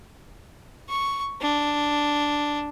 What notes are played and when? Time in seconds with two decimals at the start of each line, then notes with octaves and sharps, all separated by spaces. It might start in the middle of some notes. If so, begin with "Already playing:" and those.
0.89 C#6
1.42 D4